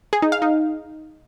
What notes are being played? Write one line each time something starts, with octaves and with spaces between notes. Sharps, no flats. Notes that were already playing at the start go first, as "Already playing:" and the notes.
G#4
D#4
F5
D#4